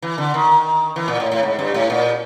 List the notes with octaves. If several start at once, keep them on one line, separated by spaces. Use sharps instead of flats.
E3
D3
D#3
E3
A#2
A2
A2
G#2
G2
A2
A#2